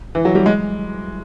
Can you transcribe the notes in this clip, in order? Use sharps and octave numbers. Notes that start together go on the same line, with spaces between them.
E3
F#3
G3
G#3